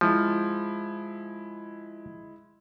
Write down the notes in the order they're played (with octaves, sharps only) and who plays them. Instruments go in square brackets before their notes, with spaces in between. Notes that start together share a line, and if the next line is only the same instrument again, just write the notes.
[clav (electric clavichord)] F3 [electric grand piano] G#3 E4